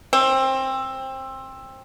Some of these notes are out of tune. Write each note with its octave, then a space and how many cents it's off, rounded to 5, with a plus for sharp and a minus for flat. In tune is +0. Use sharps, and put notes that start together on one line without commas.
C4 +20